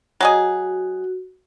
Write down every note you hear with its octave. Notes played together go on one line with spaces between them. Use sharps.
F#3 F#4 G#4 D#5